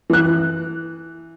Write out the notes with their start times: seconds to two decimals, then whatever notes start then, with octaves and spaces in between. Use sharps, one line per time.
0.10 E3 F#6